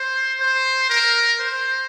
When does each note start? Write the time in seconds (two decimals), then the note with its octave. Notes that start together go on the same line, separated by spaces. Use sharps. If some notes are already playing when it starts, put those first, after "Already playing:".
Already playing: C5
0.40 C5
0.90 A#4
1.40 C5